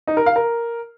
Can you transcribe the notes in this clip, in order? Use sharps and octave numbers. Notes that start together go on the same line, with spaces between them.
D#4
A#4
F5
A#4